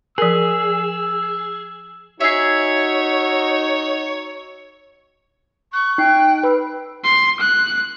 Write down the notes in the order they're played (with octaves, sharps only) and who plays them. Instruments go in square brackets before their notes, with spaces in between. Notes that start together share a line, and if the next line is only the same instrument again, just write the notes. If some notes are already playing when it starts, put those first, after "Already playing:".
[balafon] F3 A#4 [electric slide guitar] G#4 [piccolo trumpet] E6
[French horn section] D#4 F#4 [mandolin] G#4 E5 [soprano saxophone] C#5
[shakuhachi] C#6 [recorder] F#6
[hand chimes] D#4 C7 [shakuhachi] G5
[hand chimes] B4 B5 E6
[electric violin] C6
F#6